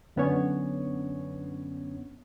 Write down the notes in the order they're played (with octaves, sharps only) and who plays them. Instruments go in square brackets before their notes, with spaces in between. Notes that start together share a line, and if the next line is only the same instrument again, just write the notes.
[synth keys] F#2 D3 B3 C#4 D4 C#5